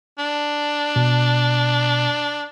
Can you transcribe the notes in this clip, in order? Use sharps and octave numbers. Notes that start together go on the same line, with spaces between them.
D4
B2